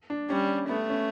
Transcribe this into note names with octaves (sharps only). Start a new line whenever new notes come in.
D4
G3 C#4
A3 B3
C#4